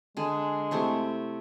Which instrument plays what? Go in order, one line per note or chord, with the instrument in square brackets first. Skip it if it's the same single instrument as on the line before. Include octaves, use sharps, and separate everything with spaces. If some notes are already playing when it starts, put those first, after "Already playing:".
[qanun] D3 G#4 [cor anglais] G#3
[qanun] C3 A3 E4